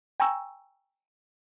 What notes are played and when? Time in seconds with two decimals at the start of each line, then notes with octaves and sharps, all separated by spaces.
0.20 G5 G#5 A#5 C#6 E6